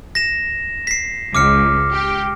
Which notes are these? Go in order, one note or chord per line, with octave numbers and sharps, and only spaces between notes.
A#6 E7
B6 C7
C#2 D6 F6 C#7
G4